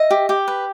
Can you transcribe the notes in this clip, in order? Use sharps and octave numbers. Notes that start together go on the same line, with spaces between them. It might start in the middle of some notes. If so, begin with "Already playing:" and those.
Already playing: D#5 E5
G4
G4
B4